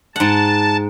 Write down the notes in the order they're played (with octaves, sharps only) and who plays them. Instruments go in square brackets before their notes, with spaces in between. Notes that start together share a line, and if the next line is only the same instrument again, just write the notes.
[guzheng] G#2 F#5 [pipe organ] A5